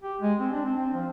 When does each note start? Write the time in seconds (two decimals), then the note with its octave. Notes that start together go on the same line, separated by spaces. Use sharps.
0.03 G4
0.21 G#3
0.39 C4
0.52 D4
0.65 C4
0.77 C4
0.94 F3